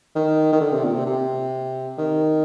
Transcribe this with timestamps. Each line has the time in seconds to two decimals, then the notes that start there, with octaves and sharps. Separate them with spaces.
0.15 D#3
0.52 D#3
0.60 D3
0.72 C3
0.84 A#2
0.95 C3
1.06 C3
1.98 D#3